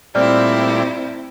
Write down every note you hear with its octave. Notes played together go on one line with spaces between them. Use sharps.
A#2 G3 A3 C4 E4 D5 F6